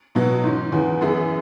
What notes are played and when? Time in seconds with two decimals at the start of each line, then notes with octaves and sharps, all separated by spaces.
0.15 B2 F#3 B3
0.44 G#2 E3 C#4
0.72 E2 C#3 E3 B3
1.01 F#2 E3 B3 E4 G#4